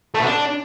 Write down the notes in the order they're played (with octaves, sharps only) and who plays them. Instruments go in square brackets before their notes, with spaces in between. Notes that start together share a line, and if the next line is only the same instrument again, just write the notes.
[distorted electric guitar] A3
B2
D4